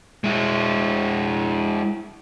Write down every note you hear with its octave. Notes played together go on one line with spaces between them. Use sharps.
G#3 E4